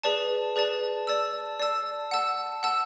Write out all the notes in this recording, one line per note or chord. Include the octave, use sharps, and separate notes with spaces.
G#4 B4 D5 A5
G#4 B4 D5 A5
D5 A5 E6
D5 A5 E6
F#5 A5 E6
F#5 A5 E6